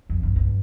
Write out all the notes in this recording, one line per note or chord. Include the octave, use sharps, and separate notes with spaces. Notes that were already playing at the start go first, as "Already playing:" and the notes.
F2
G2
G2